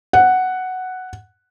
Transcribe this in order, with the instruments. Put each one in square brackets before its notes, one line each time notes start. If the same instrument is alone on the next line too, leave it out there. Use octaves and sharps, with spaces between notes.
[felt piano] F#5